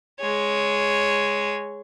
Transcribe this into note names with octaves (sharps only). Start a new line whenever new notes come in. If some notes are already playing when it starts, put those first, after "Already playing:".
G#3 C#5